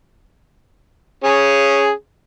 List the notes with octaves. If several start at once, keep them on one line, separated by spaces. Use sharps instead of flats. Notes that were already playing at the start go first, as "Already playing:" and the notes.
C#4 G#4